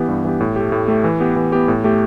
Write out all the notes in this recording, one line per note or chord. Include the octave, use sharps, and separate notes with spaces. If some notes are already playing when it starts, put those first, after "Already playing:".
Already playing: E3 B3 G4
G2
E3 B3 G4
A2
A3 G4
A2
A3 G4
E3
B3 G4
E3
B3 G4
A2
A3 G4